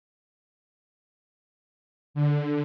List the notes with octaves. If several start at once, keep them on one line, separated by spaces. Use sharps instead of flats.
D3